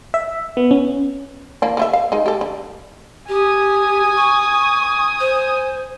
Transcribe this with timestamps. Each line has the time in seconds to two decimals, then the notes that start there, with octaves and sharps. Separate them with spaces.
0.14 E5
0.57 B3
0.71 C#4
1.62 E3 A#3 D4
1.77 D3 F4 E5
1.93 F5
2.12 G#3 D#4
2.26 G4 A4
2.41 D3
3.29 G4 G#5 D#6
4.16 C#6
5.20 C5